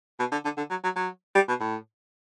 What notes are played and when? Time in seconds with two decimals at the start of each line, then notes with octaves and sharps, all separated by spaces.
0.19 B2
0.32 D3
0.45 D3
0.57 D3
0.70 F#3
0.84 F#3
0.96 F#3
1.35 G3
1.48 B2
1.60 A2